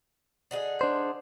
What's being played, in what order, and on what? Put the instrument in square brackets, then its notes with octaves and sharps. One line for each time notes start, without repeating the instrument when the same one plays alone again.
[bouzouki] D3 D#4 G#4
[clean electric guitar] D4 C5